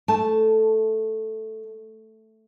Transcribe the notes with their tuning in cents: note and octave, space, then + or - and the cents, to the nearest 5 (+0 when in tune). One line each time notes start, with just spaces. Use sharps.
A3 +0 A5 +0